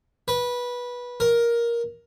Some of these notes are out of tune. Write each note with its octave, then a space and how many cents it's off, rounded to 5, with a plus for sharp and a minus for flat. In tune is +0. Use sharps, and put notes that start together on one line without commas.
B4 -15
A#4 +10